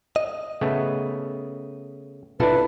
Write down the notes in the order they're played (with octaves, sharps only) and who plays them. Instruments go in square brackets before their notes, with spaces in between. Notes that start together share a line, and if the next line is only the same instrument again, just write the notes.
[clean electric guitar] D#5
[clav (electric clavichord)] C#3 A3 B3
[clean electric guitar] B1 C3 F4 [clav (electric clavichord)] D4 E4 A4 [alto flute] B4